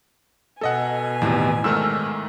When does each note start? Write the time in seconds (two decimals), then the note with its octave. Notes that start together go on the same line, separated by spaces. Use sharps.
0.61 B2 A4 D#5 F#5 G#5
1.22 E2 A2 C3 D#3 E3
1.64 G#2 D#3 A3 A4 D5 E6 F6